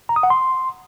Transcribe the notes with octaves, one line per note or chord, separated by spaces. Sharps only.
A#5
D#6
F#5
C6